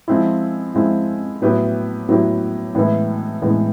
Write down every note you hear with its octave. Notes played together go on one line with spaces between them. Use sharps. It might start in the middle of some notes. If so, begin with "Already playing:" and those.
F3 G#3 C4 E4
F3 G#3 C4 E4
A2 F#3 B3 E4 G4
A2 F#3 B3 E4 G4
A2 E3 G#3 B3 E4
A2 E3 G#3 B3 E4